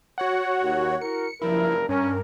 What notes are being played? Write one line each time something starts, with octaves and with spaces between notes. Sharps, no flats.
F#4 C#5 F#5
D#2
E4 F#4 A#4 C#7
F#1 G2 F3 E4 A#4
G2 C#4 A#4